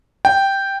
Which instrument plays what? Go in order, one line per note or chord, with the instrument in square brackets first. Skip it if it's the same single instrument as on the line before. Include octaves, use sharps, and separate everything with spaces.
[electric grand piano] G5